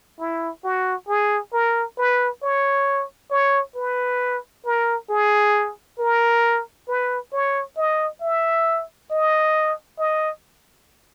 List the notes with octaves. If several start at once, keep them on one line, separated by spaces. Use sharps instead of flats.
E4
F#4
G#4
A#4
B4
C#5
C#5
B4
A#4
G#4
A#4
B4
C#5
D#5
E5
D#5
D#5